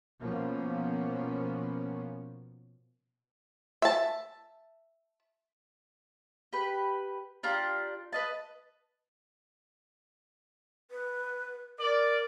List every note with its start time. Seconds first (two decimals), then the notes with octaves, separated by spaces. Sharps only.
0.20 B2 F3 A#3 B3 C#4
3.82 E5 A5
6.53 G4 B4
7.43 D4 F4 G4 A#5
8.13 B4 D#5 A5
10.91 B4
11.79 A#4 D5